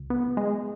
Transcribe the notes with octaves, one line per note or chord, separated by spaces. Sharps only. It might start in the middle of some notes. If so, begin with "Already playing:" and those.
Already playing: C#2
B3
G#3